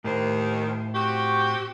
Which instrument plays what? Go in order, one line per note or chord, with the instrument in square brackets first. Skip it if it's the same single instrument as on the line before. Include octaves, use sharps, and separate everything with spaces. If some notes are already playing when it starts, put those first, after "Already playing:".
[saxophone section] D#2 D#3 [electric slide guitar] A2 C5
[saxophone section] C4 F#4 G4 [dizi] C#6